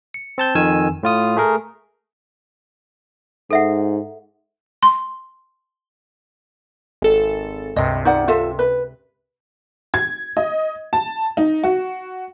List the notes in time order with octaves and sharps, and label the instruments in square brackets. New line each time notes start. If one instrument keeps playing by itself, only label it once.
[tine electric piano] C#7
C4 A5 G6
F2 D#3 G#5 E6
A2 F4 D#6
A3 G#4 A#4
[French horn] G#2 [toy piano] A4 E5 F#5
[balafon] C6
[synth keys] G#1 A4
[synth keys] C#2 G2 C3 [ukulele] D#5
[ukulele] D#4 D5 F#5
F4 A4 E5
B4
[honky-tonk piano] G#6
D#5
A5
D#4
F#4